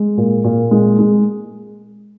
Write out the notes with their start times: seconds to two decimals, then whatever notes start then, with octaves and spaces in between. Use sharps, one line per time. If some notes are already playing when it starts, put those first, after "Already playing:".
Already playing: G#3
0.17 A#2
0.44 A#2
0.71 G#3
0.99 G#3